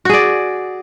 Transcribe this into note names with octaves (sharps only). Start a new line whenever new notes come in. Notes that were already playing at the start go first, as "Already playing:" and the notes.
F#4 G#4 D5